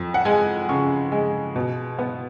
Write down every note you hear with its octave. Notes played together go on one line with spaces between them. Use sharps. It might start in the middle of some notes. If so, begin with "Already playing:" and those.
Already playing: F2
F#5
G#3 G#5
C#3 C#6
G#3
B2
B3